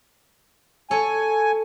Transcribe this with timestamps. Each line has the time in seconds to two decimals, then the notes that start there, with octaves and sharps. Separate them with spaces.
0.91 A4 C#5 G#5